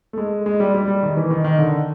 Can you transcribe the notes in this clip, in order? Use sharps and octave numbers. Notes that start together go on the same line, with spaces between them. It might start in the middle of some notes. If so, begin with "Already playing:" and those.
A3
G#3
G#3
G3
G3
G3
D#3
E3
D#3
D#3
D3